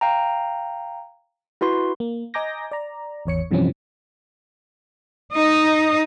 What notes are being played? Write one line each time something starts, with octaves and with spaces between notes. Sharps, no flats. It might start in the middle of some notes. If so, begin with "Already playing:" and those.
F5 G5 A#5
E4 F#4 B4 C6
A#3
D#5 G#5 A#5 D6 G6 A#6
D5 A#5
G#1 E2 C#5 C#7
G2 C3 E3 F3 C4 C#4
D#4 D#5